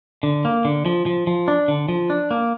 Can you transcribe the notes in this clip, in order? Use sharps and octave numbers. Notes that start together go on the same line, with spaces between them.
D3
A#3
D3
F3
F3
F3
D4
D3
F3
D4
A#3